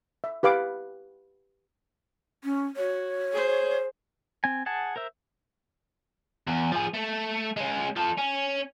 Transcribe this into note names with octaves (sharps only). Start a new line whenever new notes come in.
E5
G4 B4 F5 D6
C#4
F#4 C#5
G#4 C5
C4 G#5
G#4 F#5 G#5 A5
A#4 C5 E5
E2
F3 G#4
A3
G#3 C#4
F3 A4
C#4